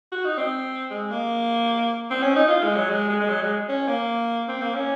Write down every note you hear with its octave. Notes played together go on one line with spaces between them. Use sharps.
F#4
D#4
C4
G#3
A#3
C4
C#4
D#4
F4
G#3
F#3
G#3
G#3
G#3
F#3
G#3
C#4
A#3
C4
A#3
C#4